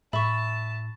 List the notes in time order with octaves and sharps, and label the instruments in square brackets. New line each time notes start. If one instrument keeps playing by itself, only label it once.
[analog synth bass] A2 [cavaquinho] E5 [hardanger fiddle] A5 [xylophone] B5 C#6